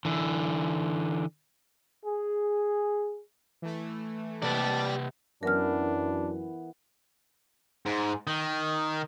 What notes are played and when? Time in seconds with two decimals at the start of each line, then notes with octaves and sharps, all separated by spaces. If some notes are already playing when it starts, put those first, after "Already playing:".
0.05 D3 E3
2.05 G#4
3.62 E3 A3
4.42 C3 G4 B4 D5 A5
5.43 F#2 E3 B3 D4 A#4 F6
7.86 G#2
8.27 D#3